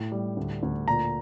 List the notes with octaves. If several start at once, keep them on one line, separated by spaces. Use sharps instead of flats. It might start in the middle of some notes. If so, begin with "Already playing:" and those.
Already playing: A2
G3
D2
D2
A#2 A#5